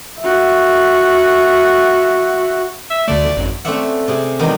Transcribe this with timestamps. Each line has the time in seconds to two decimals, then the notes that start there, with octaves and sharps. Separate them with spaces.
0.20 F#4 E5
2.90 E5
3.08 D2 D3 A3 D5
3.36 G#1 F#2
3.65 A3 C4 C#4 D5 E5 F#5
4.08 C3 C4 G#4
4.39 E2 D#3 F#3 G#3 B3 D4